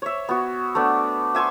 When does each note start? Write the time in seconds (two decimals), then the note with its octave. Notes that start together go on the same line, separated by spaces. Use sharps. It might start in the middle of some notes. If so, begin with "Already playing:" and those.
0.02 C#5 E5
0.29 B3 F#4
0.75 A3 B3 D4
1.35 E5 G#5 C6 C#6